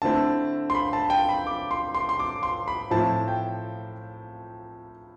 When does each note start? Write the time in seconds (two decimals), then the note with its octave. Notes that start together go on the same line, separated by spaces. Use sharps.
0.02 D3 A3 C4 E4 A5
0.70 C6
0.75 B5
0.93 A5
1.10 G5
1.29 B5
1.47 D6
1.71 C6
1.95 C6
2.09 C6
2.20 D6
2.43 C6
2.68 B5
2.91 A2 F3 C4 E4 A5
3.28 G5